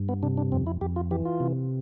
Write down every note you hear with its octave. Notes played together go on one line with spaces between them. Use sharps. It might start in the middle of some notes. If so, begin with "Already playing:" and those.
Already playing: G2
B3
C3 D4
D4
F2 C4
E4
F2 G4
F4
E3 G4
F4
C3